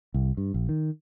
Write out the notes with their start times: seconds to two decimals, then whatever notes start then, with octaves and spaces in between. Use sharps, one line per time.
0.14 C2
0.37 G2
0.54 A#1
0.69 D#3